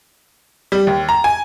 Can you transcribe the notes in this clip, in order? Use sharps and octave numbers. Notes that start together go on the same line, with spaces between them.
G3
D#2
A#5
G#5